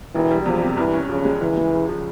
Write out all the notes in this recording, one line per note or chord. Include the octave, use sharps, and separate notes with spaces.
E1 E3
G3
E2 F3
C3
G2 E3
C#4
C#3 F3
G#3
C#2 E3
G#3
C#3
F3